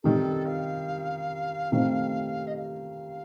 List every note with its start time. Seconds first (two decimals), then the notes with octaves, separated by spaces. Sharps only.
0.03 C3 D#3 G3 A4
0.46 F5
1.72 C3 D#3 A3 C4
2.47 D#5
2.56 F5